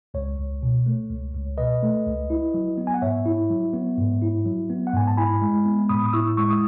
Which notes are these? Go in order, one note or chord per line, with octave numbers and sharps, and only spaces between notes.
C#2 C#5
C#2
B2
A3
C#2
C#2
B2 B4 D#5
A3
C#2
E4
F#3
B3
G#5
F#5
G#2 C#5 E5
E4
F#3
B3
G#2
E4
F#3
B3
F#5
G#2 G#5
A5
E4 G#5 B5
G#3
B3
A2 B5 D#6
D#6
E4 C#6 E6
G#3 C#6 E6
D#6